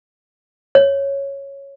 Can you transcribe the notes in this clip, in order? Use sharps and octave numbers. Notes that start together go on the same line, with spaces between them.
C#5